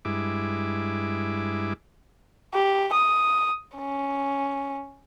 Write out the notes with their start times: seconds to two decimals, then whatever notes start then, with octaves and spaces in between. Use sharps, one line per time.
0.05 G2 G#3 E4 D6
2.54 G4
2.92 D#6
3.75 C#4